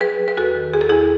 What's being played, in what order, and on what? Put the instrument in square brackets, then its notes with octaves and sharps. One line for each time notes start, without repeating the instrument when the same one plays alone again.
[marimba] F#3 G#4 B4
F#3
B4
E2 F#4 A4
D#3
E2 G#4
A4
E2 E4 G#4